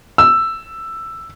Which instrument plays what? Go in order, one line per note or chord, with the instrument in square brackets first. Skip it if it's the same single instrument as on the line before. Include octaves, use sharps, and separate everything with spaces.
[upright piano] E6